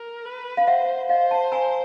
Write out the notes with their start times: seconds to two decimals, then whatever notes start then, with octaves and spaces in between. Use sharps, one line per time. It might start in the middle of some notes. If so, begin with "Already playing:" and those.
Already playing: A#4
0.25 B4
0.57 F5
0.67 C5 E5 F#5
1.09 C5 D#5 F5
1.31 G5 A5
1.52 G#5 A#5